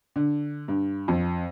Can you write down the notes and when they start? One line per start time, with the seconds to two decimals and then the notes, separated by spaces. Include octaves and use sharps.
0.16 D3
0.68 G2
1.08 F2